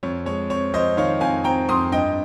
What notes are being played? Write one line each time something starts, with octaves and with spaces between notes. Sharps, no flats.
F2 C#5
G#3 C#5
C4 C#5
F2 C5 D#5
D#3 C#5 F5
F2 F5 G#5
C4 G5 A#5
F2 C6 D#6
G2 D#5 G5